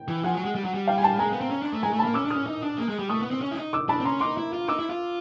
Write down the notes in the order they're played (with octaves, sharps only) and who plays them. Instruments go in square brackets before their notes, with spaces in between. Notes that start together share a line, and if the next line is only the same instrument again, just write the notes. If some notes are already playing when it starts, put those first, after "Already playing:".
Already playing: [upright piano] G5
[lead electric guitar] E3
[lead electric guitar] F3 [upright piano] F#5 G#5
[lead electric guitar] F#3
G#3
G3
F#3
G3
[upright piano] F5 G5
G#5
G5 A5
[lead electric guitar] G#3 [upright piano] G#5 A#5
[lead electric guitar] B3
C4
C#4
D4
A3
[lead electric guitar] G#3 [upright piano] G#5 A#5
[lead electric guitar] A3
[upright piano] A5 B5
[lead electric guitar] A#3
[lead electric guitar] C#4 [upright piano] D6 E6
[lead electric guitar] D4
[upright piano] D#6 F6
[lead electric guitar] C#4
D#4
D4
A#3
G#3
G3
[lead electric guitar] A3 [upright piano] C#6 D#6
[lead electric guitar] B3
C4
C#4
E4
D#4
[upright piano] D6 E6
[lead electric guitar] D4 [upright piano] A5 B5
[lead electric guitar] C4
[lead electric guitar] C#4 [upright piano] A#5 C6
[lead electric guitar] D#4 [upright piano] C6 D6
[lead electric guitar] E4
F4
[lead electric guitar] D#4 [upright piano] D6 E6
[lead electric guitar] E4
F4